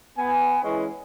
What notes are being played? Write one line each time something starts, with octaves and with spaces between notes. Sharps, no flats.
B3 G#5
E3 G#3 C#4